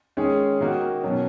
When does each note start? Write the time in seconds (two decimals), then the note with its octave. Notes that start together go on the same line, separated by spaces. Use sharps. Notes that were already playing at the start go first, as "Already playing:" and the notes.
0.17 D#3 G#3 C#4 G#4
0.61 D#3 A#3 D#4 F#4
1.03 B2 F#3 C#4